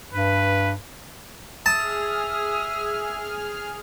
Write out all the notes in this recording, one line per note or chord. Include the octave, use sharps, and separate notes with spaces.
G2 B4
G#4 E5 A5 D#6 F6